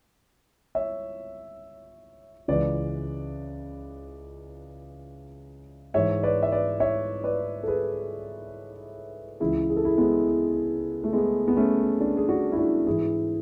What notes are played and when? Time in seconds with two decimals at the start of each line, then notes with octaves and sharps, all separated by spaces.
0.75 C#5 E5
2.48 C#2 C#3 E3 B4 D5
5.94 G#2 E3 C#5 E5
6.23 B4 D5
6.43 E5
6.52 B4 D5
6.80 C#5 E5
7.24 B4 D5
7.63 A4
7.67 G#4 B4
9.40 C#2 C#3 E3 E4 G#4
9.70 G#4
9.77 A4
9.85 E4 G#4
9.97 G#3 B3
11.04 A3
11.13 G#3 B3
11.48 B3
11.56 A3 C#4
12.00 B3 D4
12.17 G#4
12.29 D4 F#4
12.52 E4
12.57 D4 F#4
12.87 G#2 E3 E4 G#4